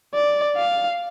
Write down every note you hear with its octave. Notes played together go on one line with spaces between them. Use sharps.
D5
F5